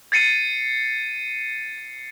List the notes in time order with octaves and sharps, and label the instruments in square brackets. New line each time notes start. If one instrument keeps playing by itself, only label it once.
[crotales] G#6 A6 C7 C#7 D#7